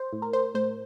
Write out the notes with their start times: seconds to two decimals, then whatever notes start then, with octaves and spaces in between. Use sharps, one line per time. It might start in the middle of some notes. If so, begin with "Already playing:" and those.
Already playing: C5
0.13 A2
0.22 A#4
0.33 C5
0.55 A2 C5